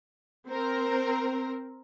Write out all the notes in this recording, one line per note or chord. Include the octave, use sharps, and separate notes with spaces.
C4 A#4